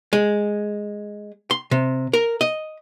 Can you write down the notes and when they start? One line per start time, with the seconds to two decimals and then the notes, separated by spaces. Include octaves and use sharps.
0.13 G#3
1.51 C6
1.71 C3
2.13 A#4
2.41 D#5